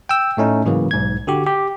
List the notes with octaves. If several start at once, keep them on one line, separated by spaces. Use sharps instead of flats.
G5 E6
A2 A3 C#4 D#4
G#2 C#3 E3 F#3 A#3
B1 G#2 G#6
D3 F#4 G4
G4